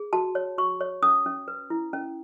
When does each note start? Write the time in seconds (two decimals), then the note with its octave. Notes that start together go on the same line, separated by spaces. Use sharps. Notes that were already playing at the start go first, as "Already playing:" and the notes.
Already playing: G#4
0.13 F#4 A5
0.35 C#5
0.58 F#4 C#6
0.80 C#5
1.03 C#4 D#6
1.26 C#4
1.48 B4
1.70 E4
1.93 C#4